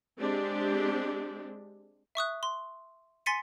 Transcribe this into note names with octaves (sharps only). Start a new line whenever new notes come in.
G#3 C4 D4 G4
E5 C#6 D#6 F#6
C6
G#5 C6 A6 B6 C#7 D#7